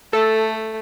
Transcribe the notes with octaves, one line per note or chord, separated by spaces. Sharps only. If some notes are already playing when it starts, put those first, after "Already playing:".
A3 A4